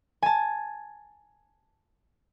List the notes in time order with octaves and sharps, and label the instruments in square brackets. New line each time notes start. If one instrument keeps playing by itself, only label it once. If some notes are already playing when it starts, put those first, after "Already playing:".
[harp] G#5 A5